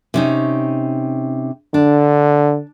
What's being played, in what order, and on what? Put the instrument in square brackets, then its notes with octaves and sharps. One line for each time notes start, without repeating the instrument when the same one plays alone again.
[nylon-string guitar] C3 C#4 D#4
[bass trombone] D3 [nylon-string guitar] D4